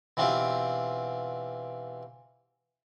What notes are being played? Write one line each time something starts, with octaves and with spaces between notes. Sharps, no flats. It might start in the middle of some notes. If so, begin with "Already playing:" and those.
B2 E3 C4 D4 F4 G4